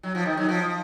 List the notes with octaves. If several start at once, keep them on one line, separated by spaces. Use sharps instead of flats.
F#3
F3
D#3
F#3
F3